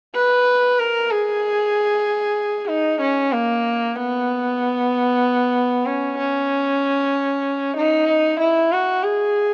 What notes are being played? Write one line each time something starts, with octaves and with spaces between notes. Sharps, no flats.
B4
A#4
G#4
D#4
C#4
A#3
B3
C#4
C#4
D#4
E4
F#4
G#4